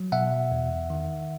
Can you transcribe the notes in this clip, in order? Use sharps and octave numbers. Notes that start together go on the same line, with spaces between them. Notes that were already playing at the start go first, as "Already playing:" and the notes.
Already playing: F#3
B2 E5 F#5
E2
D#3